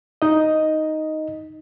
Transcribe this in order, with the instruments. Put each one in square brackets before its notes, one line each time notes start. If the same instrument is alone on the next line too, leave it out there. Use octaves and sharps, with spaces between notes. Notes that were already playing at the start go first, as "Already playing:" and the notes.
[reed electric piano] D#4 D#5